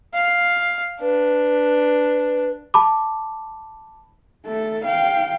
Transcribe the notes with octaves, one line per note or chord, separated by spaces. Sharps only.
F5
D4 B4
A5 B5 D6
A3 A4
F5 G5